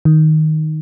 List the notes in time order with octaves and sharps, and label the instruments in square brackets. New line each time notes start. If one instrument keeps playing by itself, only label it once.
[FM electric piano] D#3